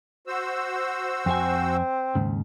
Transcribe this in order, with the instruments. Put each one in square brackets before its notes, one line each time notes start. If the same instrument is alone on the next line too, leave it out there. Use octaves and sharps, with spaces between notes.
[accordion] F#4 C5 E6
[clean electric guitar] F2 G4 G#5 [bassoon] C4
[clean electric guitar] D#2 G#2 C#3